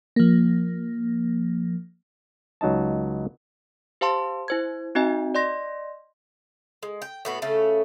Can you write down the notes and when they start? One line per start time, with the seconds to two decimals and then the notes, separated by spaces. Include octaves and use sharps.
0.16 F3 A#3
2.61 C#2 F#3 D#4 D#5 A5
4.01 G4 C5 F5 A5 C6
4.48 E4 C5 G#6
4.95 C4 D#4 F#4 D#5 G#5
5.35 D5 D#5 C6 A#6
6.83 G#3
7.02 G5
7.25 A2 B3 F#4
7.42 C#3 A3 C#4 A4